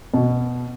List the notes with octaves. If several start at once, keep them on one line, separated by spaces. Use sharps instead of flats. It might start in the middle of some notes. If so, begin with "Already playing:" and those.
B2